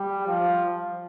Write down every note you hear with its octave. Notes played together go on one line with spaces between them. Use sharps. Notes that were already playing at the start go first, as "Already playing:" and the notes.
Already playing: G3
F3